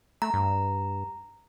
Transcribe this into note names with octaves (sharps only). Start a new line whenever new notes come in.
A3 A#5
G2